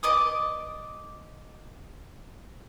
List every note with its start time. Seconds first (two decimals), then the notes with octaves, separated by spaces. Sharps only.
0.03 D5 D#5 D6 D#6